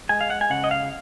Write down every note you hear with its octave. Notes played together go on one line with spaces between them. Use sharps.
G#3 G#5
F5
F#5
G#5
C#3 F#5
D#5
F5